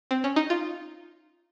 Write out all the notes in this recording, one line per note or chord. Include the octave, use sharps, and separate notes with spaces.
C4
C#4
D#4
F4